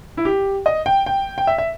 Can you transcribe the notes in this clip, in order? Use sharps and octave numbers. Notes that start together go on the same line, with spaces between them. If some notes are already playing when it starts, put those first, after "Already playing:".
E4
G4
D#5
G5
G5
G5
E5
E5